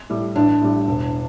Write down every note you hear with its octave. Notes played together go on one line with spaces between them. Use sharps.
A2 G3
A1 D4
A2 G3
E1